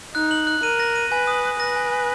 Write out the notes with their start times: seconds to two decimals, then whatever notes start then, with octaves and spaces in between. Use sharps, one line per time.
0.14 D#4 F#6
0.31 F#7
0.47 F#6
0.63 A#4 D#7
0.80 A#6
0.96 D#7
1.12 B4 G#5
1.27 D#6
1.44 D#6
1.60 B4 A#6
1.76 G#5
1.92 G#5